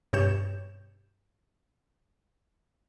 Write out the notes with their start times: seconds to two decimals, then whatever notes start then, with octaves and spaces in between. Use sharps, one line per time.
0.13 G2 B2 G4 C#5 G6 E7